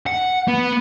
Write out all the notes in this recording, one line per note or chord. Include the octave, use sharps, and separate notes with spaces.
F#5
B3